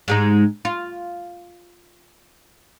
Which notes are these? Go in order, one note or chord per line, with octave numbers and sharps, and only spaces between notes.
G#2 G#3 D#4
F4